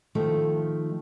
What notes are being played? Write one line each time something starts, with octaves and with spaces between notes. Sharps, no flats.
D#3 F3 A3